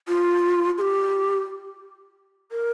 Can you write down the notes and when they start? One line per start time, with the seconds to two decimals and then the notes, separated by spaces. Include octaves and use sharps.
0.08 F4
0.78 G#4
0.81 G4
2.51 A#4